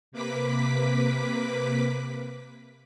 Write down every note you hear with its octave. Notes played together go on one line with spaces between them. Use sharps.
C3 A#3 B4 D6 B6